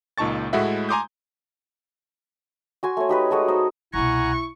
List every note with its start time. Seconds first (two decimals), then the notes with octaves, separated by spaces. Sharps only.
0.18 C#2 A#2 D#4 A5 C#6 A6
0.53 A2 G#3 A3 E4 F#4 E5
0.89 G#5 A#5 C6 D6 D#6 G6
2.83 F#4 G#5 C6
2.97 A3 C#5
3.09 D#4 G4 B4
3.31 G#3 F#4 A4 D#6
3.48 D#4 C5
3.94 C2 B2 E4 F#5 G#5 A#5 C#6